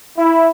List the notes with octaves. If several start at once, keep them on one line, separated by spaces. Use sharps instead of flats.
E4